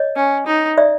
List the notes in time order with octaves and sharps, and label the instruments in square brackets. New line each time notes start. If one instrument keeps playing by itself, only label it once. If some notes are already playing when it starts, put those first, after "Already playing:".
Already playing: [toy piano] C#5 D#5
[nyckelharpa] C#4
D#4
[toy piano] D5 E5